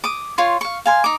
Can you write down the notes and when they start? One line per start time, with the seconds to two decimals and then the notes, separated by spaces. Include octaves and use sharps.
0.04 D6 D#6
0.38 F4 C#5 C6
0.61 F5 C#6
0.86 F5 G#5 C6
1.04 D#4 D6